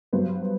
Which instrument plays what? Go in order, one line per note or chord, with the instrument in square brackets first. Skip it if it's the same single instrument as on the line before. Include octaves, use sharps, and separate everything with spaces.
[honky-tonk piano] G2 F#3 B3 C5